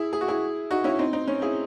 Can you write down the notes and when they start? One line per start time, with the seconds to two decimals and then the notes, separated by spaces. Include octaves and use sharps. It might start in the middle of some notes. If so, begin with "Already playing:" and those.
Already playing: E4 G#4
0.13 G#4
0.21 F#4
0.28 E4 G#4
0.71 D#4 F#4
0.84 C#4 E4
0.99 C4 D#4
1.13 C4 D#4
1.28 C#4
1.42 E4 G#4